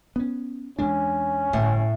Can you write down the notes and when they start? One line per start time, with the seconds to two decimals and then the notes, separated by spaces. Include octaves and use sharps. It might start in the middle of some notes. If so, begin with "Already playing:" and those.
0.16 B3 C#4
0.79 E2 G#3 C#4 D4
1.53 G1 A2